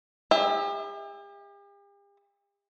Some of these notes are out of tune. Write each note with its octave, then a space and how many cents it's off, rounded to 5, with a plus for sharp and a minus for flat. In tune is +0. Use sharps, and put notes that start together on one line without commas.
G4 +45 E5 -20